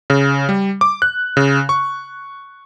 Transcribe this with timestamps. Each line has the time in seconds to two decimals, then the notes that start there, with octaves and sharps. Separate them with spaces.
0.10 C#3
0.49 G3
0.81 D6
1.02 F#6
1.37 C#3
1.69 C#6